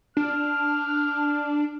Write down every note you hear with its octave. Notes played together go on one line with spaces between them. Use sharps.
D4 F6